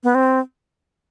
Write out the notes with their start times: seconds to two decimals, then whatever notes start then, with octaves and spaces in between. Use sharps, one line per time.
0.04 B3
0.15 C4